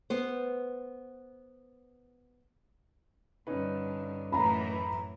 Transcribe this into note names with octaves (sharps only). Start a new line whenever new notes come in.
B3 C5
G2 D3 C#4 D#4 B4
F#2 A2 E3 A#5 B5